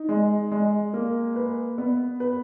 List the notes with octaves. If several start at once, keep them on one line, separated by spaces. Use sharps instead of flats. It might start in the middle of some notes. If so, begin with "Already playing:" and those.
Already playing: D#4
G#3
G#3
A#3
B4
B3
B4